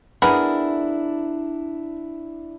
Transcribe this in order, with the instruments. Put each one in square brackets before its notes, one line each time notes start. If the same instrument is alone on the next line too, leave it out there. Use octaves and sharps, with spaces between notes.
[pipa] B3 G#4 A#4 [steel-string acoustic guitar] D4 E4